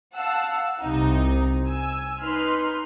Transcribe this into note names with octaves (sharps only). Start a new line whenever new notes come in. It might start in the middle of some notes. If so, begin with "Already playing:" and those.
F5 F#5 A5 E6
C2 C3 D#4
G#5 E6
D#4 B4 C6 F6